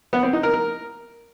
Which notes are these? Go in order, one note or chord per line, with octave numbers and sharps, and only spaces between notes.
B3
C4
D#4
A#4
A#4